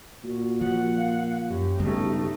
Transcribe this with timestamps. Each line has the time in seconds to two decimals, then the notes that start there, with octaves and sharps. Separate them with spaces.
0.24 A#2 F#4
0.61 F3 F#5
0.97 F5
1.49 F#2 G4
1.80 B1 G2 C#3 A3 D#4